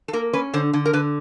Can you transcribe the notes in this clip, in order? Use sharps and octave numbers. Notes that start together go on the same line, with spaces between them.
A4
A#3 A#4
C#4 B4
D3 C5
D3
A#4
D3 B4